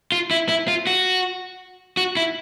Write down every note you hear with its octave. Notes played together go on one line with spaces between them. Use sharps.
F4
E4
E4
F4
F#4
F#4
E4